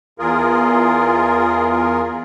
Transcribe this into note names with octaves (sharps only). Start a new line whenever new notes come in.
E2 F4 G#4 A#4